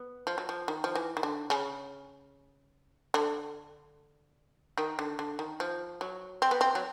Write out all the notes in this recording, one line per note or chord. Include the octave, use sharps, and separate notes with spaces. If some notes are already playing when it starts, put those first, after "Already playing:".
Already playing: B3
F3
F#3
F3
D#3
F3
E3
D#3
D3
C#3
D3
D#3
D3
D3
D#3
F3
F#3
C4
B3
C4
F#3